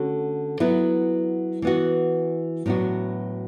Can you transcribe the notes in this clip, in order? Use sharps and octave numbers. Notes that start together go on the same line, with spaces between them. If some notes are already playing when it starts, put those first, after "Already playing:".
Already playing: D3 A3 C#4 F#4
F#3 B3 E4
E3 B3 F#4
A2 F#3 B3 D4 F#4